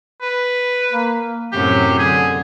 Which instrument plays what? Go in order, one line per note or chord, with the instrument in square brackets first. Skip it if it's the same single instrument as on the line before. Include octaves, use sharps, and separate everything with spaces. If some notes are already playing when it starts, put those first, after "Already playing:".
[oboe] B4
[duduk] A#3
[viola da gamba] F#2 A2 C3 [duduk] F#3 [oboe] G4
[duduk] D3 [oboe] G#4